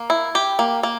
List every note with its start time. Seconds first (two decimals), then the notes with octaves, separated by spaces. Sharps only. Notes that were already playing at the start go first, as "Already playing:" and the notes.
Already playing: A#3
0.10 E4
0.35 G4
0.59 A#3
0.83 A#3